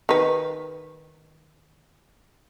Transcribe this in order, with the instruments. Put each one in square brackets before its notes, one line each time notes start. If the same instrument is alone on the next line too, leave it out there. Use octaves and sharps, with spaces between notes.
[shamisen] D#3 B4